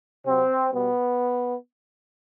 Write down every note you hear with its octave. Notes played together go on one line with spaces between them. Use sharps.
C3 F#3 C4
B2 G3 B3